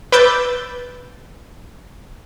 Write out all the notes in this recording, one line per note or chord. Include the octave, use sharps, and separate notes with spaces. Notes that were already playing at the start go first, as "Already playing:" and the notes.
B4 D6 E6 G6 A6